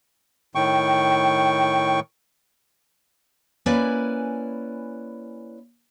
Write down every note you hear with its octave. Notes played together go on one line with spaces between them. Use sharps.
A2 D#3 G5 C#6
A#3 C#4 E4 B4 D5 G#5